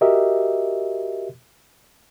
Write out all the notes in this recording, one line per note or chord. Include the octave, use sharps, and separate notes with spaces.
F#4 G4 A#4 D#5 E5